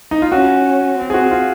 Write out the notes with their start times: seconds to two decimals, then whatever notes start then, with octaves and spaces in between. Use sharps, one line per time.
0.11 D#4
0.22 F4
0.32 C#4 F#4
0.98 C4
1.10 G#4
1.14 F#4
1.31 F4